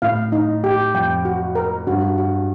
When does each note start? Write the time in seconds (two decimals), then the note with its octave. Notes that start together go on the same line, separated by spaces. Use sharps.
0.02 A2 F5
0.32 D#4
0.64 G4
0.94 F2 G5
1.25 F#4
1.55 A#4
1.87 G2 F#4
2.18 F#4